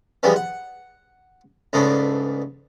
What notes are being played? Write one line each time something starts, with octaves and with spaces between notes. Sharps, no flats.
E3 F3 G3 G#3 B3
F#5
C#2 G#2 C#3 A3 B3 D4